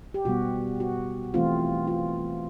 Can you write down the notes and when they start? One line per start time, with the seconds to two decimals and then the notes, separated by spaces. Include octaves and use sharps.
0.14 G4
0.25 B2 G3 B3 F#4
0.80 F#4
1.34 E3 A3 C4 F4
1.87 F4